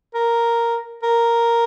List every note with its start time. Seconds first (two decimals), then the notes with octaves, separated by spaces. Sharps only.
0.14 A#4
1.03 A#4